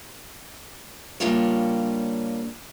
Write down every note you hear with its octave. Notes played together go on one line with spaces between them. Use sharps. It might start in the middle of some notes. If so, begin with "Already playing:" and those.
C#3 G3 A#3 D4 F4 C#5